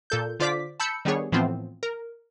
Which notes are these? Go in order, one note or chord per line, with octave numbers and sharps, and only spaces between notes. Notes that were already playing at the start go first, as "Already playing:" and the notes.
A#2 A4 G6
D3 F4 C5 D5 D6 B6
A5 B5 E6 G6 C#7
D#3 G3 B3 D4 G#4 C#5
A2 E3 F3 B3 C4 F4
A#4